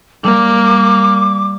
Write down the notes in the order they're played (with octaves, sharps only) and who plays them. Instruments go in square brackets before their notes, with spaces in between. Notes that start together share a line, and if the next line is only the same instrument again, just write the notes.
[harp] G3 [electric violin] A#3 [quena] D6